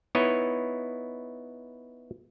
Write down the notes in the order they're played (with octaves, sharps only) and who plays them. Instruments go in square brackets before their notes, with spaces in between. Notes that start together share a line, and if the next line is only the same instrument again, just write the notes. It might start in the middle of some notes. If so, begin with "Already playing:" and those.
[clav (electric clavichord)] B3 D#4 E4 C#5 D#5